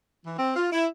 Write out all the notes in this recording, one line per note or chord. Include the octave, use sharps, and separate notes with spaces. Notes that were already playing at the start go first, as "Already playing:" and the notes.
E3
C4
F4
E4